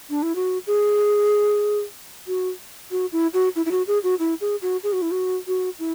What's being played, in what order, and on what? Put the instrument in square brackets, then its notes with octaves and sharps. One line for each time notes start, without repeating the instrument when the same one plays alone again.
[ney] D4
E4
F#4
G#4
F#4
F#4
E4
F#4
E4
E4
F#4
G#4
F#4
E4
G#4
F#4
G#4
F#4
E4
F#4
F#4
E4